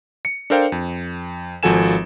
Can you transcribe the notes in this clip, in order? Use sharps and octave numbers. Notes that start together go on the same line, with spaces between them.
C#7
D4 A4 A#4 C5 F5 G5
F2
G#1 F3 F#4 A4 G#5 E7